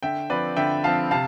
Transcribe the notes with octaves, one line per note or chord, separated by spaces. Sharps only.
D3 E5 G5
F3 C4 B4 D5
D3 E5 G5
F3 C4 F5 A5
C3 F5 A5